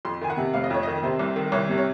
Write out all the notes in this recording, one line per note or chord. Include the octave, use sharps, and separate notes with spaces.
F2 C6
D#3 G#5
F#5
C3
F1 F5
D#5
F2 C#5
D#3 D#5
C3 C5
C2
D#3
C2 C#5
C3
C#5